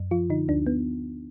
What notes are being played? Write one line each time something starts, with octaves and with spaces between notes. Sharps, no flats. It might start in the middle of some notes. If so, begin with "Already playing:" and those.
Already playing: F#2
F3 F4
D3 D#4
D2 D4
B3